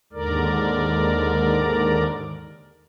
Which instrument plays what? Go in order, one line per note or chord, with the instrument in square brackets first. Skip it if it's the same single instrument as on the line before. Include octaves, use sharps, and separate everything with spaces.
[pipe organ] D#2 G#2 D3 A#4 D5